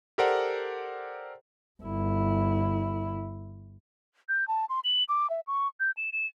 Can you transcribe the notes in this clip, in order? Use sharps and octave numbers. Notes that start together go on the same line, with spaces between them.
G4 A4 A#4 C5 D5 F#5
G1 E4
G6
A5
C6
F#7
D6
E5
C#6
G6
E7
E7